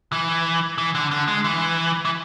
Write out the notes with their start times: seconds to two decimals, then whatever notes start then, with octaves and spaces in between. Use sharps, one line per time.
0.12 E3
0.78 E3
0.95 D3
1.11 D3
1.28 G#3
1.44 E3
2.05 E3